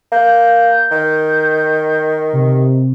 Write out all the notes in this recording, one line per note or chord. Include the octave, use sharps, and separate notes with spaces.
A#3 G6
D#3
C3